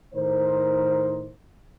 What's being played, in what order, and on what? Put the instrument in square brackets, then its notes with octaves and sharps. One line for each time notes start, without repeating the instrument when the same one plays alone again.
[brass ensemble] A2 D#3 D#4 A#4 C5